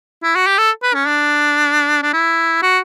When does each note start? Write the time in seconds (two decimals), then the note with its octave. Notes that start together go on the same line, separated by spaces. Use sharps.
0.23 E4
0.35 F#4
0.47 G4
0.58 A4
0.83 B4
0.94 C#4
1.06 D4
2.02 D4
2.13 E4
2.62 F#4